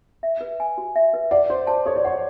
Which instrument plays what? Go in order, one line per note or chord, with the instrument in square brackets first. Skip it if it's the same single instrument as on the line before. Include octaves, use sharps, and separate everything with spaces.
[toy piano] E5
B4
G#5
F#4
E5
B4
[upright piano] D5 [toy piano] F#5
[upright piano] C5 [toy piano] C#5
[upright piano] C5 [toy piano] A5
[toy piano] A4 [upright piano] C#5
[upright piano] D5
[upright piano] C#5 [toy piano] F#5